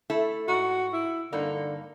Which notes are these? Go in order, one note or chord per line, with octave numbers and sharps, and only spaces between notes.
A3 E4 A4
G#2 F#4
E4
G2 D3 A#3 D#4